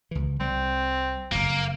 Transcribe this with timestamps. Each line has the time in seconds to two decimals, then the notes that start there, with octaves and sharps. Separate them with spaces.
0.11 C#2 E3
0.40 C2 G3 C4
1.32 F#1 F2 A#3